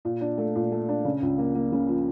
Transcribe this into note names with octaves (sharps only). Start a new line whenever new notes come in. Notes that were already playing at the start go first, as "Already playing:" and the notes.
A#2
D4
A3
A#2
A3
D4
C#3
C#2
A#3
A#3
C#3
F3